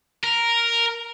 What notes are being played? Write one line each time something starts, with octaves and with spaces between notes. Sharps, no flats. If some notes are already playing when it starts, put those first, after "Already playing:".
A#4